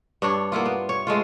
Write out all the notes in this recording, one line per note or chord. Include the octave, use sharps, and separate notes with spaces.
G2 D4 C#5
A#3 B3 E4 F4
B3
C#5
G#3 A3 F4